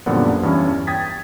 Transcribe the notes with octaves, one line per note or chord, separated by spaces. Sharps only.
F#2 A#2 D3 F3 G3 B3
E2 G2 E3 C#4
G5 D#6 G#6 A6 B6